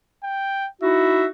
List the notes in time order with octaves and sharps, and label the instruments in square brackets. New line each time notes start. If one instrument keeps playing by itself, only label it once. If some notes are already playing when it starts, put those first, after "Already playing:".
[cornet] G5
[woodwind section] D#4 E4 F#4 [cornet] E5